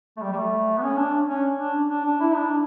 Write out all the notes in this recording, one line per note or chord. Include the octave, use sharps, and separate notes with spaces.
A3
G3
G3
A3
B3
C#4
D4
C#4
D4
D4
D4
E4
D4